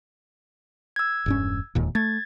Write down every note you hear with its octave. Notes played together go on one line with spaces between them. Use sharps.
E6 G#6
E1 G2 C#4
E1 D#2 A#2
A3 G#6 A6